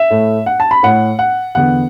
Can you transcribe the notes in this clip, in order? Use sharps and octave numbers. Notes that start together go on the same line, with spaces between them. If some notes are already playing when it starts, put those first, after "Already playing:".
Already playing: E5
A2 A3
F#5
A5
B5
A2 A3 F#5
F#5
E2 D3 B3 F#5